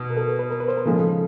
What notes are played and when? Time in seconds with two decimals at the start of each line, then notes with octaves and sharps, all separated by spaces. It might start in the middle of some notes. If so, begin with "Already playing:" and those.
Already playing: B2
0.10 A#4
0.17 A4
0.29 B4
0.39 B4
0.51 A#4
0.60 B4
0.68 C5
0.77 A#4
0.85 C#3 F3 G#3 A4